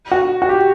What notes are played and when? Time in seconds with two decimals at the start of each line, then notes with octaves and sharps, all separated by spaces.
0.11 F#4
0.42 F#4
0.49 G4